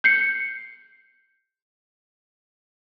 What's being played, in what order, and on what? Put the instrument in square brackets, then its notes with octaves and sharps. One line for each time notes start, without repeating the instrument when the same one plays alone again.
[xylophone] G6 C7 C#7